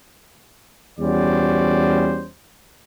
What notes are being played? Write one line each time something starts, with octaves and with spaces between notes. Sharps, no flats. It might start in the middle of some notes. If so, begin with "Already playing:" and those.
E2 G3 C#4 F#4 C5 D5